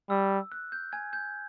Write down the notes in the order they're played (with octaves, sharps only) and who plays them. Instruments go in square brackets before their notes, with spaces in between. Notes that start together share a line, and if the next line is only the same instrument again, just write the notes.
[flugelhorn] G3 [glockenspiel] E6
[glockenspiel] F#6
G6
G#5 G#6
G6